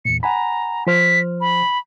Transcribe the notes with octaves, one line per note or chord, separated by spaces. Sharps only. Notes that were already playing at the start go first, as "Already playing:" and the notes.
E2 A#2 C#7
F#5 G#5 A#5 B5
F3 C5 F6 B6
B5